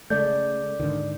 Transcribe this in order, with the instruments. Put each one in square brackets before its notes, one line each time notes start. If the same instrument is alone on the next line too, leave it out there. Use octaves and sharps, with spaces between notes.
[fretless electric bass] C#3 G#3 A3 [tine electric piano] D5 G6
[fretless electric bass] G#2 D3 D#3